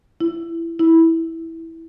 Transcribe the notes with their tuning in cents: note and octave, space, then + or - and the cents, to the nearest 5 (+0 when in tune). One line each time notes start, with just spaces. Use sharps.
E4 +15
E4 -10